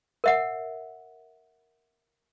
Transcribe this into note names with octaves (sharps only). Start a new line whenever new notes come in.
A#4 E5 F#5